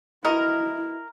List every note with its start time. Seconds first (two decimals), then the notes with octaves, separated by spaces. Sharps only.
0.25 B3 E4 F#4 A#4 D#5